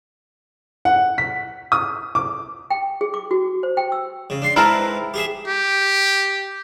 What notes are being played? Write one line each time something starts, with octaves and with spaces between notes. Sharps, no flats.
F#5
B6
D#6
D6
G5
G#4
D6
F#4
C5
G5
E6
C#3
D4 C6
G#2 C4 E4 A#4 B4 A5
G4 G#4 E5
G4